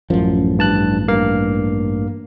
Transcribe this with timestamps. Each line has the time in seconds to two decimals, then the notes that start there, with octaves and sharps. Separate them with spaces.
0.10 A1 F#2 F3
0.59 G2 A5 F#6
1.08 G2 A#3 F5